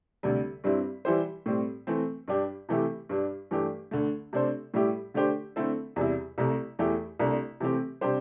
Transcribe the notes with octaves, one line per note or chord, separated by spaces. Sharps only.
D2 C3 G3
G2 G3 C4 E4
E3 G3 E4 G4 C5
A2 G3 C4
E3 A3 C4
G2 G3 D4 G4 D5
C3 E3 A3 E4 G4
G2 G3 D4
G2 E3 A3 D4 G4
D2 D3 A3
C3 A3 D4 A4 C5
A2 G3 E4 G4
D3 A3 D4 G4 C5
D3 A3 C4 E4 A4
E2 C3 G3 E4
C2 C3 A3
E2 E3 A3 E4 G4
C2 C3 A3 D4
C3 E3 A3 C4 G4
C3 G3 D4 G4 C5